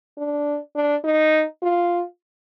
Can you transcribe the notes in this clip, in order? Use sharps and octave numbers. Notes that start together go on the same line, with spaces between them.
D4
D4
D#4
F4